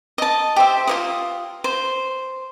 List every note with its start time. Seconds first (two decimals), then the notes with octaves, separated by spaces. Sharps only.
0.18 D#5 A5
0.56 G4 C5 E5
0.87 F4 C#5 D#6
1.64 C5